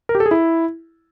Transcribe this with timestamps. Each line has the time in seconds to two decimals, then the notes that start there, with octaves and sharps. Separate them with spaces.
0.09 A#4
0.15 G4
0.20 A4
0.26 G#4
0.31 E4